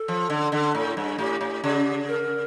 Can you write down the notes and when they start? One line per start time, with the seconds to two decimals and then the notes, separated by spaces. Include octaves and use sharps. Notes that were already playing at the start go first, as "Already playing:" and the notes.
Already playing: A4
0.08 F3
0.30 D3
0.52 D3
0.75 A2
0.97 G2
1.19 A2 G4
1.41 A2
1.64 C#3
2.07 A#4